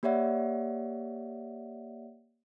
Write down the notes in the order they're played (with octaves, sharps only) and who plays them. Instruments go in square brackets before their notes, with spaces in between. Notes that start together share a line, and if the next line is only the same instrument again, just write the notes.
[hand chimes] A#3 G4 C#5 D5 E5 F#5